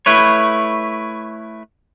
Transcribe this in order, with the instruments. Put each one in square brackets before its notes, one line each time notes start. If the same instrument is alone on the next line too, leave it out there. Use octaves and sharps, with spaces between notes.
[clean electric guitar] A3 E4 B4 C#5